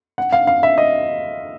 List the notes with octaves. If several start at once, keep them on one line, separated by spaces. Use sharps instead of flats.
F#5
F5
F5
E5
D#5